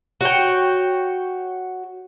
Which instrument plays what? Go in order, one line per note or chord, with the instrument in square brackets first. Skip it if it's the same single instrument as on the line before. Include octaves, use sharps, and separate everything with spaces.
[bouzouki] F#4 C#5 G5